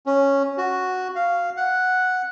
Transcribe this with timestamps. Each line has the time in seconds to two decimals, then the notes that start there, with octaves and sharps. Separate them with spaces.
0.06 C#4
0.58 F#4
1.15 F5
1.57 F#5